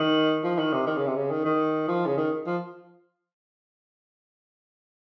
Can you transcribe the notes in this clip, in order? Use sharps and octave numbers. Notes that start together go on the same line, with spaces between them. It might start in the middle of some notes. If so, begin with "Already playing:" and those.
Already playing: D#3
F3
D#3
C3
D#3
C#3
C3
C#3
D#3
D#3
F3
C#3
D#3
F3